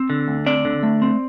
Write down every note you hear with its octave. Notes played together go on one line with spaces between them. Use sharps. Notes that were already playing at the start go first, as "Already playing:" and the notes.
Already playing: C4
D3
D2
C4 D5
D3
A3
C4